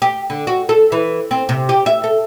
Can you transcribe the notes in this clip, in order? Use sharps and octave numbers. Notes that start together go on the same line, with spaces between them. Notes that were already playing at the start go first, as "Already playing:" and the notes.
G4
D3
F#4
A4
E3
C4
C3
G4
E5
A4